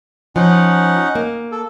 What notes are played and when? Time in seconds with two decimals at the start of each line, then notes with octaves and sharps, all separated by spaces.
0.36 F3 C#4 D#4 F#5
1.15 A#3
1.52 A4